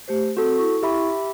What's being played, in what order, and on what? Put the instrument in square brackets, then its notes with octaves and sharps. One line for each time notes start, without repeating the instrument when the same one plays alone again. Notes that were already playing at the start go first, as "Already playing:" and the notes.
[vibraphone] A3 G4 C5
[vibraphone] C4 [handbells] F#4 A4
[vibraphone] E4 C#6
[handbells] G4 E5 B5